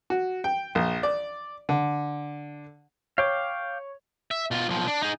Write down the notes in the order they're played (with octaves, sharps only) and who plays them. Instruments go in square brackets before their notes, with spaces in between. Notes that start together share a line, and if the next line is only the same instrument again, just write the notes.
[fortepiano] F#4
G5
A#1
D5
D3
[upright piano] C#5 [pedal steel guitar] F5 G5 D6
[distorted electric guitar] E5
B2 F4
B1 F3
D4
D#4 G#4